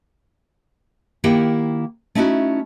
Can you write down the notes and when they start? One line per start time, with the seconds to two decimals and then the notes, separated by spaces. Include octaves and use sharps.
1.24 D#3 A#3 E4 G4 F#5 G5
2.15 A3 C#4 D#4 E4 F#4